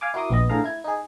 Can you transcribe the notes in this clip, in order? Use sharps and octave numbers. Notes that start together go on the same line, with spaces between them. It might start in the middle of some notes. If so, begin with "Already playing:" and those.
F5 G#5 D6
E4 F#4 A#4 C6 D6 D#6
A#1 B3 D#5
A2 D3 G#4 A4 F5 A#5
E4 G#6
D#4 G#4